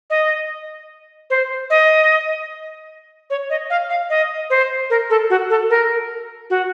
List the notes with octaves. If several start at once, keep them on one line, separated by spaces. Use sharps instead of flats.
D#5
C5
D#5
C#5
D#5
F5
F5
D#5
C5
A#4
A4
F#4
A4
A#4
F#4